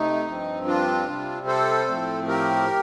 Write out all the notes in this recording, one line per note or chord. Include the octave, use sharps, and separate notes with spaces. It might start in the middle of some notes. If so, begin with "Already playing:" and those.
Already playing: C3 A3 D#4
G2 F3 C4
D4 F4
C3 G3 C4
A4 C5
A2 F3 A3 C4
G4 A#4